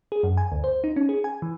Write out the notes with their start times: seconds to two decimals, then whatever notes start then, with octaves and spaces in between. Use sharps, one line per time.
0.12 G#4
0.23 F#2
0.37 G#5
0.52 D2
0.64 C5
0.84 D#4
0.96 C#4
1.09 G#4
1.24 G#5
1.42 E3